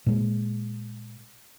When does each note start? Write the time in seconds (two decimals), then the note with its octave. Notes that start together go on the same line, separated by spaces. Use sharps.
0.06 A#2 G#3